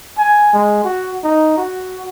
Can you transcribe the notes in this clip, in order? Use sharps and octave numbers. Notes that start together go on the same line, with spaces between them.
G#5
G#3
F#4
D#4
F#4